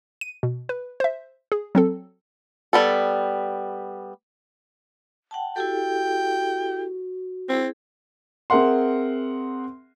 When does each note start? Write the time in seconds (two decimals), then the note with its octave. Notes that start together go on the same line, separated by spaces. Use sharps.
0.21 D#7
0.43 B2
0.69 B4
1.00 C5 E5
1.52 G#4
1.75 F#3 C4 A4
2.73 G3 B3 A4
5.31 F#5 G5 A5
5.56 E4 F#4 G4 A4 G5
7.49 C4 E4 G#4
8.50 C4 G#4 A#4 E5 F#5 C6